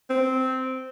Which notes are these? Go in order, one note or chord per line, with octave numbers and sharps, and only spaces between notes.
C4